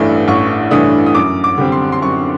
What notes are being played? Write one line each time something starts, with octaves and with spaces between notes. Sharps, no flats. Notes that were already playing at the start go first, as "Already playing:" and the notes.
Already playing: A1 G2 E3 A3 D4
A1 C#6
G2 E3 A3 D4 D#6
D#6
F#2 D6
D6
D3 G3 C4
C6
C6
F#2 C#6